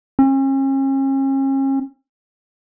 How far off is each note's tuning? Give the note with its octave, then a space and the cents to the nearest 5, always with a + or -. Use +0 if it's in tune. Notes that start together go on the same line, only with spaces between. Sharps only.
C#4 -40